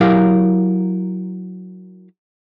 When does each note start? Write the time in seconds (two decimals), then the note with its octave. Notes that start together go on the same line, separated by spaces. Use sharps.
0.01 F#3 E4 G4 A#4 F5